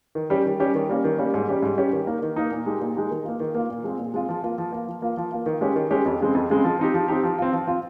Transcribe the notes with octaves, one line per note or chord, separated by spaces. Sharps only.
D#3
G3 C#4 G4
D#3
G3 C#4 G4
D#3
G3 A#3 C#4
D#3
G3 A#3 C#4
G#2
G3 C#4 G4
G#2
G3 C#4 G4
D#3
A#3 D#4
D#3
A#3 D#4
A#2
G#3 D#4 G4
A#2
G#3 D#4 G4
D#3
A#3 F4
D#3
A#3 F4
A#2
G#3 C4 F4
A#2
G#3 C4 F4
F3
A#3 F4
F3
A#3 F4
F3
A#3 F4
F3
A#3 F4
D#3
G#3 C#4 G4
D#3
G#3 C#4 G4
F2
C#3 G#3 C4
F2
C#3 G#3 C4
F3
C4 D#4 G4
F3
C4 D#4 G4
F3
C4 F4
F3
C4 F4